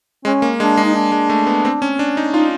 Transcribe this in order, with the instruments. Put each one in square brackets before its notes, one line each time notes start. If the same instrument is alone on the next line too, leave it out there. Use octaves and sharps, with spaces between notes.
[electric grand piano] G#3 [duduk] C#4
[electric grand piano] A#3
[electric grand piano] G#3 [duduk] D4
[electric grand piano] G#3
[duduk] D#4
D4
[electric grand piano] G#3
A3
B3
C4
C#4
D4
D#4
[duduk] D#4 [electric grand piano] F4